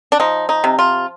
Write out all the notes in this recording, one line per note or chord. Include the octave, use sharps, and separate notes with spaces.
D4
F3 D#4
D#4
C3
F4